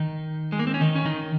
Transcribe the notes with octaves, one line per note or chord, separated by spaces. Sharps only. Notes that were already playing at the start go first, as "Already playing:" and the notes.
Already playing: D#3 D#4
G#3
A#3
C4
C#4
D#3 D#4
C#4
D#3 D#4